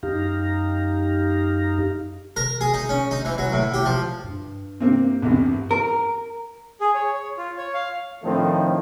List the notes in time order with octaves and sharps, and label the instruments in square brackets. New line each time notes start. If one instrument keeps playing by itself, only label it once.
[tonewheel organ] F#2 D#4 G4 F5 A#5
[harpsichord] A#4
G#4
D#4
C#4
D#4
E3
F#3
A2
G4
F3
[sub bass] G2
[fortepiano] C3 A#3 C4
A1 E2 C3
[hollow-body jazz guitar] A#4
[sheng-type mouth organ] G#4
C#5
C#5
F4
C#5
F5
[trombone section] A2 D#3 F3 A3 C4 D4